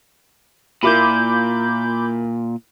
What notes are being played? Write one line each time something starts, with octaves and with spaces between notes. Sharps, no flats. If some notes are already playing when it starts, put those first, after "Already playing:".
A#2 E4 F4 A#4 B5 D6 G6